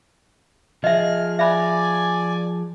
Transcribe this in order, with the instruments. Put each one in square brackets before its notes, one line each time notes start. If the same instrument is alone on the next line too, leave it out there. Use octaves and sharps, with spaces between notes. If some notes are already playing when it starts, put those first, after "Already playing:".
[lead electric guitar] F3 G#4 [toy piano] D#5 E5 [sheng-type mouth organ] F6
[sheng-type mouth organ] D5 G#5 [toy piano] E5 B5